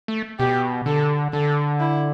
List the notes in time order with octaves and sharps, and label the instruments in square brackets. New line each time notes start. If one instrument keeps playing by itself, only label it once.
[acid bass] A3
[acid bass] B2 [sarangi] G4
[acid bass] D3 [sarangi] A4
[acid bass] D3 [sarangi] A4
[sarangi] E4